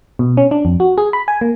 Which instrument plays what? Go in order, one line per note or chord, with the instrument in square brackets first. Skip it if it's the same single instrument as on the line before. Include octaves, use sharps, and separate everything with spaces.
[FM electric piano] B2
C#4
D4
F2
F#4
G#4
B5
G#5
A#3